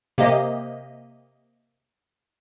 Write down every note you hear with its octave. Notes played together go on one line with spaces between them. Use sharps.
C3 A#3 G4 D#5